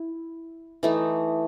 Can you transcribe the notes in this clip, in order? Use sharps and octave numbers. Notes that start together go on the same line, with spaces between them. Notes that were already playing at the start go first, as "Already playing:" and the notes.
Already playing: E4
E3 A3 D#4